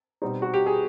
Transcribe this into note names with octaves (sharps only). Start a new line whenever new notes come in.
B2 G3 C4 D#4
F#4
G4
G#4